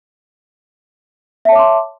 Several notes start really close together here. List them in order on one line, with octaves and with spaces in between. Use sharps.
E5 A5 C#5 D6 C6